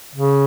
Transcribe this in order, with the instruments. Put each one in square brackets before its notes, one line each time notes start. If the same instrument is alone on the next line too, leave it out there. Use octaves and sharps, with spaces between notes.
[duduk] C#3